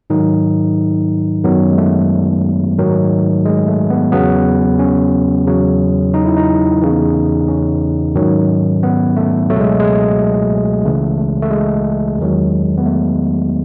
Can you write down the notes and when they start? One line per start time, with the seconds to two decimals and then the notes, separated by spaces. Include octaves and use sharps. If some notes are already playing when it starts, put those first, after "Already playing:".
0.10 G#2 D#3 F#3 D#4
1.44 F#2 D#3 F#3 B3
1.71 G#3
1.78 A3
2.78 G#2 D#3 F#3
3.46 G#3
3.68 A3
3.90 B3
4.12 E2 C#3 F#3 B3
4.79 C#4
5.47 E2 C#3 F#3
6.14 D#4
6.26 E4
6.37 D#4
6.82 E2 C#3 E3
7.48 C#4
8.15 G#2 D#3 F#3
8.83 B3
9.17 A3
9.50 C#2 B2 F#3 A3
9.60 G#3
9.80 G#3
10.84 C#2 C#3 E3 A3
11.18 A3
11.42 A3
11.51 G#3
12.18 E2 D#3 F#3
12.78 B3
12.85 A3